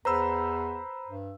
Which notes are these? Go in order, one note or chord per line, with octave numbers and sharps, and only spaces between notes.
E2 B4 C5 A#5 B5 E6
G2